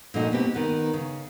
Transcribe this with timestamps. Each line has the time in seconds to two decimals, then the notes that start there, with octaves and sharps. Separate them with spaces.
0.14 A#2 F3 A3 D#4 F#4
0.32 B2 B3 C4 G4
0.55 D#3 B3
0.93 C#3